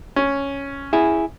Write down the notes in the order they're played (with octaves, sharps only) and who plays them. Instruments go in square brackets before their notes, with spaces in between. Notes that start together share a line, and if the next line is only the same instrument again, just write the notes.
[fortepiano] C#4
[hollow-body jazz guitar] E4 G#4